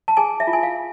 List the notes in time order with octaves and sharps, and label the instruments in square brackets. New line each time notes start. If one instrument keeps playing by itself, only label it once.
[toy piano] A5
G#4 G#5
E5
F4
G#5
F5